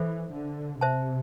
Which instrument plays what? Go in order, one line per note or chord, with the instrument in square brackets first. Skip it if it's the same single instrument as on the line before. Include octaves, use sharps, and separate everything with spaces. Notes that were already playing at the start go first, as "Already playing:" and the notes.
Already playing: [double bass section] E3 [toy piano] A4 C5 E5
[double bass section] D3
[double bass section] C3 [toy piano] C5 E5 A5